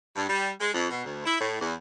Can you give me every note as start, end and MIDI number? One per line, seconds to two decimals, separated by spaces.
0.16 0.28 43
0.29 0.50 55
0.60 0.73 56
0.73 0.87 41
0.89 1.01 47
1.04 1.25 38
1.26 1.38 64
1.40 1.57 45
1.60 1.73 40